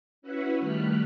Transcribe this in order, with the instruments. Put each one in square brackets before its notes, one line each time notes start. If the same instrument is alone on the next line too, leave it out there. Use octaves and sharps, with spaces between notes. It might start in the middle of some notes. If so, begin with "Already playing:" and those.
[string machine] C#4 E4 F#4 B4 E5 F#5
D#3 G3 A3 F6 F#6 B6